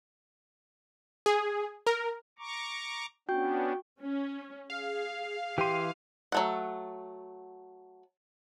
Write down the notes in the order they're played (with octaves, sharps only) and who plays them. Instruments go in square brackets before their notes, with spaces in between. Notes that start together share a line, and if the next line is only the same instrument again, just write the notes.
[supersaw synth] G#4
A#4
[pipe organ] A#5 C#6 D6
[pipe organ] B3 C#4 D4 [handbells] F#4 G5 G6
[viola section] C#4
[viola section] G#4 [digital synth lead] F5
[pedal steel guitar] E3 C6 [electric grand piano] G4 D#7
[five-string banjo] F#3 A3 F#5